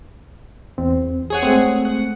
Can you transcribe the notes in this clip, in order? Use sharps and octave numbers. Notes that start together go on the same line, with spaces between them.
E2 C4
G#4 C#5 F#5
G#3 A3 C4
F#5